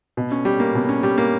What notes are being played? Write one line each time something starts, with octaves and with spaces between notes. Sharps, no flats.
B2
C#4
G3
A#3
B2
C#4
G3
A#3